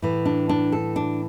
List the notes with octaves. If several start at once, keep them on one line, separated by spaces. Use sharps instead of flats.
A2 E3
D4
D4
A4
D4